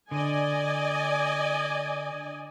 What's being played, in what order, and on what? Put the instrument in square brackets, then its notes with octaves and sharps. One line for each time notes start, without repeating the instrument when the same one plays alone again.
[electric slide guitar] D3 [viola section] D5 D#5 G#5